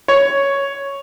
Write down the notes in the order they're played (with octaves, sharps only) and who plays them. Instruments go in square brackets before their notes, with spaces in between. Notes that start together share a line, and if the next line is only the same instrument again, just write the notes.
[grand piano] C#5